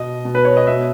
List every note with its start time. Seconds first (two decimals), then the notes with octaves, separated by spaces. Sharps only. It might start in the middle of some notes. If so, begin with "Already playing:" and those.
Already playing: B2 D#5
0.25 B2
0.35 B4
0.45 C#5
0.57 D#5
0.67 B2 E5